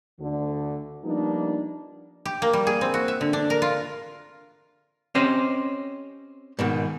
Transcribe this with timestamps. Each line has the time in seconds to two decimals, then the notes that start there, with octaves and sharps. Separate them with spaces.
0.20 D2 D3
1.05 F3 G3 A#3 B3 D4 D#4
2.25 G4
2.42 A#3
2.53 G3
2.67 G#4
2.81 C4
2.94 F#4
3.08 E5
3.21 D3
3.33 D4
3.50 A#4
3.62 F4
5.15 C4 C#4 G4 C5 C#5 D#5
6.59 G#2 B2 D#3